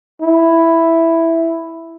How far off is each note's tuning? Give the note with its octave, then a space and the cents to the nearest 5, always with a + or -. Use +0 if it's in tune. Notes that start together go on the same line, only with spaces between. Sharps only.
E4 +0